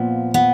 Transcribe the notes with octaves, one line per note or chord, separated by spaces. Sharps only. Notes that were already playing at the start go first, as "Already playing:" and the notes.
Already playing: A#2 F3 B3
B3